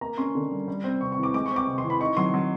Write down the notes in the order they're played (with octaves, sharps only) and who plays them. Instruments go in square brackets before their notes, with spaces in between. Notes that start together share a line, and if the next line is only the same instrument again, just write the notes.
[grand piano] A#3 A#5
C#4 C6
D3
G3
G3
C4
C3 C#6
C#6
E3
D6
G#3 D6
C#6
C4
D6
C3
C6
E3
B5
D#4 C#6
F#3 C6
F#3